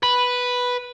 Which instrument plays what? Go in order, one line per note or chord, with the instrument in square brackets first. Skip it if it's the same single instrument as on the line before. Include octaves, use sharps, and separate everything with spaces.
[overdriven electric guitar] B4